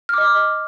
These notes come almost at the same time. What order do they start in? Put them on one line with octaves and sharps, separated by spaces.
F6 D6 D#5